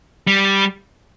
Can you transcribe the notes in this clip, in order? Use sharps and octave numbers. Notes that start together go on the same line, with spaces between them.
G3